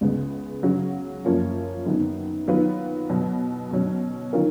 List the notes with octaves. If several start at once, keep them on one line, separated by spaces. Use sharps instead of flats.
C#2 C#3 G#3 B3
C#3 F#3 C#4 F#4
F#2 F3 A#3 C#4 F4
F#2 D#3 F#3 B3
D#3 F#3 B3 F4 B4
B2 F#3 B3
B2 F#3 C#4
D#3 F#3 C#4 F4 A#4